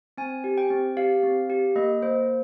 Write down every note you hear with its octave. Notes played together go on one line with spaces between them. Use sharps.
C4 G#5
G4
G5
C4
G4 F5
C4
G4
A#3 D#5
A#3 C5